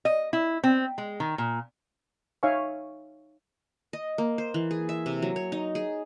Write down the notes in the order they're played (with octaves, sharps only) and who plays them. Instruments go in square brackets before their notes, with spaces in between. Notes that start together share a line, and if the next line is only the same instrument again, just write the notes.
[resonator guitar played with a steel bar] D#5
E4
C4
G#3
D#3
A#2
[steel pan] D#4 C#5 E5 F5 G#5 C#6
[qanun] D#5
A#3
C5
E3
G#4
E5
C3
F#3
C#5
D#4
G#4